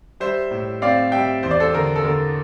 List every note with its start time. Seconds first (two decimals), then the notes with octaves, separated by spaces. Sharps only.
0.20 G3 C5 E5
0.51 A2
0.82 C4 D5 F5
1.12 G3 E5 G5
1.43 E2 C5
1.51 D5
1.60 A4 C5
1.74 D3 A#4
1.96 A4
2.04 D3 A#4